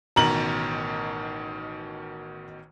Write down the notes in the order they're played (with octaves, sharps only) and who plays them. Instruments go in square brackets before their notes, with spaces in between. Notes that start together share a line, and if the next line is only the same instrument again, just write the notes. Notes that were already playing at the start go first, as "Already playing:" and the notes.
[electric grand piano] A1 B2 D#3 [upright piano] A#5 F#7